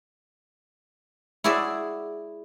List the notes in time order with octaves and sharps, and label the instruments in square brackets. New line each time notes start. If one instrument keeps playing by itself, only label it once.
[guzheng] E4 F#4 G#4 D5 E5